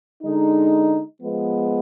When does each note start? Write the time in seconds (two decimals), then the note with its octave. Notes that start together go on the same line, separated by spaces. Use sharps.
0.22 D3 G#3 D#4
1.22 F3 G#3 B3